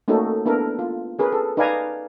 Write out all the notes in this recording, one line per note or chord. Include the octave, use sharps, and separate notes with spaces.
A3 A#3 C#4 D#4 F#4 A4
B3 D4 E4 A4 A#4
F4
C#4 G#4 A#4 B4
A4
D#4 B4 D5 F5 G#5 A#5